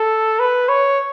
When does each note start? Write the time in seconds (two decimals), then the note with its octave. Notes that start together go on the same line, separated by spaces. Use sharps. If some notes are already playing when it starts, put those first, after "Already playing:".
Already playing: A4
0.40 B4
0.69 C#5